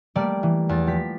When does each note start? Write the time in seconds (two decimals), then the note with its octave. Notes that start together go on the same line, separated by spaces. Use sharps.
0.16 G3 A3 A#3 D5
0.43 E3
0.69 E2 A6
0.87 F3 G4 B6